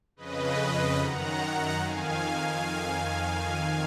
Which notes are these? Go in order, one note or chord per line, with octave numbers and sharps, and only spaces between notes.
F2 C#3 B4 D#5
F#2 D#3 F#5 A#5
F2 D#3 F5 G#5